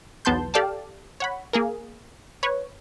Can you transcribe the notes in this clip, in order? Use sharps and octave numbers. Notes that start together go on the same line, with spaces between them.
B1 E2 B3 A5 C6 G6
G4 A4 D5 F5 G5 A5
C#5 F#5 B5
A#3 G#4 A#4
B4 C#5